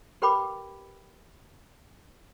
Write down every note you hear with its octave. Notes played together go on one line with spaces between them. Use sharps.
G4 A#4 B4 G5 B5 D6